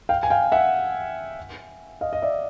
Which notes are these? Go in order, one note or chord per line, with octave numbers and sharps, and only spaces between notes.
F5 G5
G#5
F5 G5
E5 F#5
D#5 F5
D#5
D5 E5